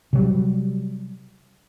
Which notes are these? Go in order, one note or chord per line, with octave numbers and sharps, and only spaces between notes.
C3 F#3 G3